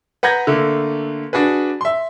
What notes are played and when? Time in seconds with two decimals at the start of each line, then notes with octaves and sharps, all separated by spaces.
0.23 B4 F#5 A#5 G6 G#6 A#6
0.47 D3 A3 A#3
1.33 D4 F#4 G#4 B4
1.81 E5 C6